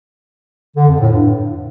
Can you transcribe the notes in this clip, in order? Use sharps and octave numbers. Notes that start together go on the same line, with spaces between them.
D3
F2
A2
G2